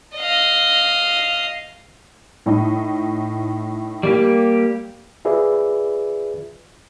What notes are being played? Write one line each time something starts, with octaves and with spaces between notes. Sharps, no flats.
D#5 F5
A2 D#4
G3 A#3 G4
F4 G#4 B4 D5 E5